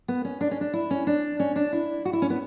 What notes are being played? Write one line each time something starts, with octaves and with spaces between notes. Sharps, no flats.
B3
C#4
D4
C#4
D4
E4
C#4
D4
C#4
D4
E4
F#4
E4
C#4
B3